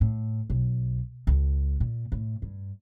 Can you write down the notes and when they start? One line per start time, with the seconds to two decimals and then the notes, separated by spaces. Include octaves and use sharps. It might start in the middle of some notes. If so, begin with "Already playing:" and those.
0.01 A2
0.50 B1
1.27 C#2
1.80 A#2
2.12 A2
2.42 G2